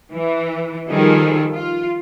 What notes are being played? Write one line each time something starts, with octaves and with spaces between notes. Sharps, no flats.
E3
D#3 F3 G3 G#4 A4
F4